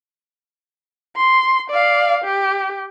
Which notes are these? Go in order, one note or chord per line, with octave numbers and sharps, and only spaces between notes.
C6
D5 F5
G4